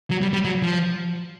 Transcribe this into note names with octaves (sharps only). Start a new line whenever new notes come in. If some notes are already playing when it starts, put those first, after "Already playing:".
F#3
G3
G3
F#3
F3